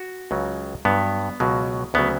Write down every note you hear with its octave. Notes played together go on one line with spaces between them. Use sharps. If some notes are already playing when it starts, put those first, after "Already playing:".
Already playing: F#4
C#2 C#3 F#3
G2 F#3 B3
C#2 B2 F#3
D2 C#3 F#3 B3